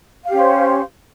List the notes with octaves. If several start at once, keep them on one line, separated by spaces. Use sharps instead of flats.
C#4 G4 C5 F5